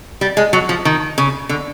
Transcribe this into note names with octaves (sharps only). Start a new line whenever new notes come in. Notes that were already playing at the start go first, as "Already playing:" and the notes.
G3
G#3
F#3
F3
D#3
C#3
D3